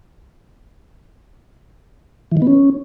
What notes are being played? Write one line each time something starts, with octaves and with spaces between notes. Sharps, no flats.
E3
D#3
B3
C#4